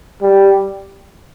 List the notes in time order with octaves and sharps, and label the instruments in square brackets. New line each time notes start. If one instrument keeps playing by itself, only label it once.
[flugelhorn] G3